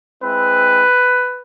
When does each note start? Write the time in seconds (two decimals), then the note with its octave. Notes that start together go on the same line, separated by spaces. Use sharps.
0.23 G#3 C4 E4 B4